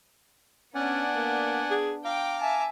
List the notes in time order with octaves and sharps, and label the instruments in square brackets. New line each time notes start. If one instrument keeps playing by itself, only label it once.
[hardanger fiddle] B3 D4 [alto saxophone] C#4 [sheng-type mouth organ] D5 F#5 G#5
[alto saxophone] A#3
G#4
[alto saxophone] F5 [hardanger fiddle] G5 [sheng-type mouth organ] A#5 D6
[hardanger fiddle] E5 A5 [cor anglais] G#5